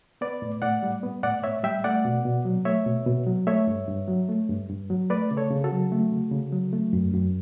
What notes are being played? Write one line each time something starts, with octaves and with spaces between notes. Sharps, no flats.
B3 B4 D5
A2
A2 D5 F#5
G3
B3
A2 D5 F#5
A2 C#5 E5
G3 E5 G5
A3 D5 F#5
B2
B2
F#3
A3 C#5 E5
B2
B2
F#3
A3 C#5 E5
G2
G2
F#3
A3
G2
G2
F#3
A3 B4 D5
C#3
A4 C#5
C#3
F#4 A4
F#3
A3
C#3
C#3
F#3
A3
F#2
F#2